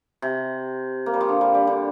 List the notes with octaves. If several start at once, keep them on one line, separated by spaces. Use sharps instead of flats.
C3
A#3
G3
F3
D3
G3
G3
D3